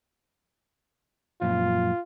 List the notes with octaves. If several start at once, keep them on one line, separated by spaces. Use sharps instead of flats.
F#2 A#2 F3 F4